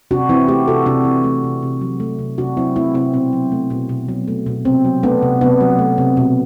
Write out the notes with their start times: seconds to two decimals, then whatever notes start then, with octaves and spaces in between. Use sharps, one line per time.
0.11 C3 D4 F#4
0.29 E3 C4 E4
0.48 A3 E4 G4
0.68 C3 F#4 A4
0.86 C3 D4 F#4
1.05 E3
1.24 A3
1.44 C3
1.62 C3
1.81 F#3
2.00 A3
2.19 C3
2.38 C3 D4 F#4
2.57 F#3 C4 E4
2.76 A3 C4 E4
2.94 C3 C4 E4
3.14 B2 C4
3.33 F#3
3.52 A3
3.70 B2
3.89 B2
4.08 F#3
4.28 A3
4.46 B2
4.65 C3 C4
4.85 F#3
5.03 A3 B3 D4
5.22 C3
5.41 C3 B3 D4
5.60 F#3
5.79 A3
5.98 C3
6.17 B2